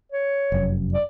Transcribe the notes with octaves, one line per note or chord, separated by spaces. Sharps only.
C#5
F1 F#2
D5